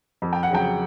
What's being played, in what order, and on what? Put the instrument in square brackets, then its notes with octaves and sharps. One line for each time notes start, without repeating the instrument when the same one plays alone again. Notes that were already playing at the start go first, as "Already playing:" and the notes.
[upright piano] F2
G5
F#5
C#3 F#3 G5